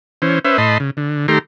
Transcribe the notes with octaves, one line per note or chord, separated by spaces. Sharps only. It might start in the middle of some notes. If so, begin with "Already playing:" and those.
E3 C#4 C5
C#4 B4 C5 E5
A2 D#5 A5 B5 C6
C#3
D3
D#3 A3 G4 A#5 C6